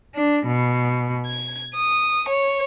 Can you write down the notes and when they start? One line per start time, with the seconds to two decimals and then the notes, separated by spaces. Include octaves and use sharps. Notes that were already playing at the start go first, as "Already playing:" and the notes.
0.15 D4
0.46 B2
1.26 G#6
1.75 D#6
2.28 C#5